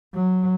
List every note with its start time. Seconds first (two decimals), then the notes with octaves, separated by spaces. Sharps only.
0.14 F#3